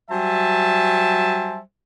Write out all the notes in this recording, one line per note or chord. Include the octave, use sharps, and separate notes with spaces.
F#3 G3 C5 E5 G#5 A5